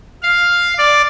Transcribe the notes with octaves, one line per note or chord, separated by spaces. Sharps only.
F5
D5